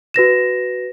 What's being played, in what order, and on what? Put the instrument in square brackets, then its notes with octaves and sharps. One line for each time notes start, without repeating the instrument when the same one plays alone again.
[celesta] F#4 B4 A#6 E7